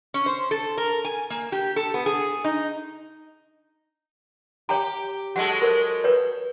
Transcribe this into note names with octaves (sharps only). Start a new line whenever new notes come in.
C#4
C5
A4
A#4
G#5
A#3
G4
A4
B3
G#4
D#4
G4 C#5 G5 A#5
F#3 G#3 A4 F#5
A#4 C5
B4 C#5